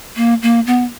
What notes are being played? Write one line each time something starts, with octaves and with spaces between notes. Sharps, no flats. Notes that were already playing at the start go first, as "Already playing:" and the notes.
A#3
A#3
B3